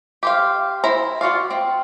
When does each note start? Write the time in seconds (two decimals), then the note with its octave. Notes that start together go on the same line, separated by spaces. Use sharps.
0.23 G4 C5 F5
0.84 E4 C5 A#5
1.21 F4 F#4 D5 F5
1.50 C4